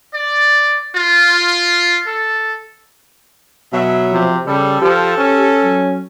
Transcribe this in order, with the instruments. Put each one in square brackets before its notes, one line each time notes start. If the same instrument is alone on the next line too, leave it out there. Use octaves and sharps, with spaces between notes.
[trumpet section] D5
F4
A4
[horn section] B2 F#3 E5
[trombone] C3 [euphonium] F3
[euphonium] C#3 [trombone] G3 [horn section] A4
[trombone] F3 [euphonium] G4
[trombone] C#4
[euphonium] F#3